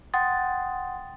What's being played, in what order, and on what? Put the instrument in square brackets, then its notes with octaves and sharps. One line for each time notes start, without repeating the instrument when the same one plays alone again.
[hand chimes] F#5 G5 C6 D#6 A6